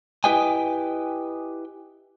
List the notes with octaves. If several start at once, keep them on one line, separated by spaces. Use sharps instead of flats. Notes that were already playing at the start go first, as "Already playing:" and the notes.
E4 G4 B4 D#5 G5 G#5